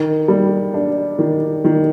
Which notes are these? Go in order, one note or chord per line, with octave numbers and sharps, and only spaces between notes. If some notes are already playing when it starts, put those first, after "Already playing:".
Already playing: D#3
G3
D4
D#3
D#3